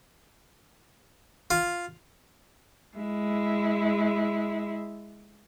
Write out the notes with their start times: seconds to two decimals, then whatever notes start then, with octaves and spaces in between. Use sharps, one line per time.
1.51 F4
2.97 G#3 E4